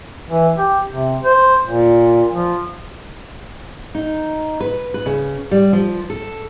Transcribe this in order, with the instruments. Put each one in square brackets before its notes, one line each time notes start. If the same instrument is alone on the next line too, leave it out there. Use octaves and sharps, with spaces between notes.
[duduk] E3
G4
C3
C5
A#2
F3
[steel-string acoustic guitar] D#4
B4
B4
C#3
G3
F3
A4